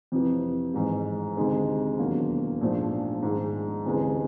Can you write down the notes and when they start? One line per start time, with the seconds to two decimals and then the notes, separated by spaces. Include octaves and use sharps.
0.12 F2 C3 E3
0.74 A1 G#2 D#3 G#3
1.37 D2 C3 D#3 G#3
1.99 E1 D#2 D3 F#3 A#3
2.61 A#1 G#2 F3 A3 D4
3.22 G#2 D#3 G#3
3.86 D2 C3 E3 G#3 C#4